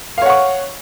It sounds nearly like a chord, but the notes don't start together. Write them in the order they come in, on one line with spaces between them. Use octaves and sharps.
F5 C#5 F#5 C#6